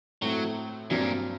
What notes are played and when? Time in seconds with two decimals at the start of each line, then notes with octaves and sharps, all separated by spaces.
0.22 A2 F#3 A3 C4
0.90 G2 A#2 F#3 C4